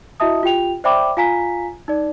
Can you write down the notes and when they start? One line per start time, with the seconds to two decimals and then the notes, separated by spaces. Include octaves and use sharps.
0.20 E4 F#4 D#5 E5 A5 D#6
0.43 F4 G4 G5 F7
0.84 C5 D5 E5 G5 B5 D6
1.17 F4 F5 G#5 A#5 B6
1.88 D#4 D5